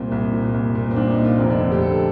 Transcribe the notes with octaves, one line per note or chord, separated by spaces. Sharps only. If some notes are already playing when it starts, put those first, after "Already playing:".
Already playing: C2 A#2 C4
C2
A#2
C2
A#2
C4
C2 D4
D#4
A#2
F4
F1 C4
D4
F2 D3
G4
F1 A4